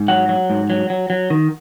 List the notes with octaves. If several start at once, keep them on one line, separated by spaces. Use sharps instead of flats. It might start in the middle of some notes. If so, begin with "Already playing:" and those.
Already playing: G#2
F#3 F#5
F#3
G#2
F#3
F#3
F#3
D#3